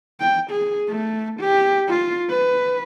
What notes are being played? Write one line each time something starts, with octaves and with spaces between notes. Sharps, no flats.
G5
G#4
A3
G4
F4
B4